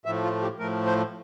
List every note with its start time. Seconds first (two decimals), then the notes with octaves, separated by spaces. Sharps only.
0.05 A2 F3 A3 E5
0.23 F4
0.42 G4
0.59 A2 F3 A3 A#4
0.86 C5